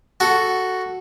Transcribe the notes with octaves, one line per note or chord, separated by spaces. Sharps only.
F#4 A4